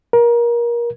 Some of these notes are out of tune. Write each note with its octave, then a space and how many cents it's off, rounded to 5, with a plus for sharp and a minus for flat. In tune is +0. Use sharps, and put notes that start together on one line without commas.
A#4 +25